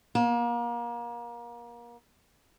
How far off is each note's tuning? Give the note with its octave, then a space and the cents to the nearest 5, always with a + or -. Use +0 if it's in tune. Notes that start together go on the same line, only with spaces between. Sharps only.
A#3 +30